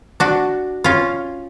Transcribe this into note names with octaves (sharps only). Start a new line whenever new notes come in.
D4 F#4
C#4 F4